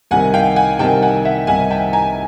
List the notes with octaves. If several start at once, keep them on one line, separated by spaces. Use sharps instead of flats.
C2 C3 D#3 F#5 G#5
F5 G5
F#5 G#5
C2 C3 D#3 G5 A5
F#5 G#5
E5 F#5
C2 C3 D#3 F#5 G#5
G5 A5
G#5 A#5